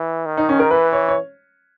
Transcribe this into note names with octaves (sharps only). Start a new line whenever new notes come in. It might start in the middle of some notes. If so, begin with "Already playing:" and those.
Already playing: E3
D#3
D#4
C#4
A#4
E3 B4
C#5
C#5